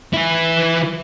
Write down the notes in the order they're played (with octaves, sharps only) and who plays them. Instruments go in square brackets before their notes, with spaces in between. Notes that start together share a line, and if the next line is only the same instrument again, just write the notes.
[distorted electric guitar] E3 E4